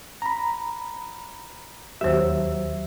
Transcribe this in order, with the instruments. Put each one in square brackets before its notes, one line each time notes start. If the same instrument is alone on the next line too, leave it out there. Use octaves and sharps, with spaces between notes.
[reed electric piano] A#5 B5
[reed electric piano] D#2 F#3 E5 [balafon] G4 C5